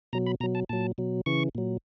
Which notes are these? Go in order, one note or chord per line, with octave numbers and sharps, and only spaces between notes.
B2 F#3 A#5
B5
B2 F#3 A#5
A5
A#2 F#3 A5
B2 F#3
C#3 E3 C#6
A#2 F#3